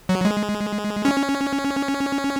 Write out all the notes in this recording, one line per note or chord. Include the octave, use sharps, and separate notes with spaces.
F#3
G#3
C#4